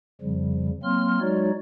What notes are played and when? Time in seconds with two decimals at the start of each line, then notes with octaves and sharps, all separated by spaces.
0.21 F2 C#3 F3 G3
0.83 F#3 A#3 C4 C6 F6
1.20 F#3 G#3 D#4 F#4 C#5 D5